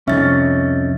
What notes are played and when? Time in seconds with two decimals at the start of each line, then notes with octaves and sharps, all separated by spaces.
0.08 C2 F2 C#4 D#4 E5 A6